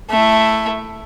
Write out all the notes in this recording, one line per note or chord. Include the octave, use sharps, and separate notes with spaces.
A3 E4